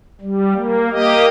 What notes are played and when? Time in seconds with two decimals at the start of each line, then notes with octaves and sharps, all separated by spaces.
0.21 G3
0.54 A#3
0.91 A#3 G4 D#5